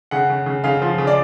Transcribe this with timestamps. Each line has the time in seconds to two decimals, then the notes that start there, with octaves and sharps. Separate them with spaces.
0.11 C#3 F#5
0.29 C#3
0.46 C#3
0.64 C#3 F5
0.82 F3
0.98 C#3
1.07 D5